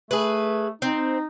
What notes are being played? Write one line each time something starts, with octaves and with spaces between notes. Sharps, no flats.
A3 G#4 B4
C4 D#4